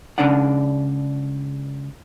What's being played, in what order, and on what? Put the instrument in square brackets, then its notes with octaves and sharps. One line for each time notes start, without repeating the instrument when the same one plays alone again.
[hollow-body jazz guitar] C#2 C#3 C#4 D4 D5 F#5